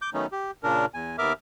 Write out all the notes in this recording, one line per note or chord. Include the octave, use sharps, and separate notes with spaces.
D6 G6
D#3 F#3 A3 B3 C#4 D#4
G4
A#2 C#3 D4 A#4
E2 G#5
D#2 B3 A#4 E5 D6 F6